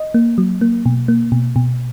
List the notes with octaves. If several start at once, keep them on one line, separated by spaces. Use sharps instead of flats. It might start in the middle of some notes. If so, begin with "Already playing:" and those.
Already playing: D#5
A#3
F#3
A#3
B2
A#3
B2
B2